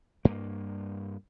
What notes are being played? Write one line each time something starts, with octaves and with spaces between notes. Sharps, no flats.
G2 A#3